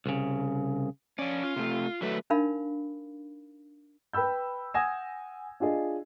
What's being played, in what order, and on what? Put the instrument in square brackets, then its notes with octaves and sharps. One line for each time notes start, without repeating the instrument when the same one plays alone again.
[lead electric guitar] C2 C#3
[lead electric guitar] F3 D5 [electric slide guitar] C#4
[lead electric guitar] F4
[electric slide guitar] C3 A3
[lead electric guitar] D3 B4 [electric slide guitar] F#3 A3
[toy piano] D4 D#4 A#4 F5 B5
[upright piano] B4 G5 B5 E6 G6
F#5 G#5 D#6 G#6 A#6 E7
D4 F4 G#4 D#5